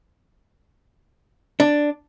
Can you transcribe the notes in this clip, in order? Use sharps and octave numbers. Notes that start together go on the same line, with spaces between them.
D4